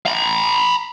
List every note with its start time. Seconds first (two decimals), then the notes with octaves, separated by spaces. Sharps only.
0.06 A#5 B5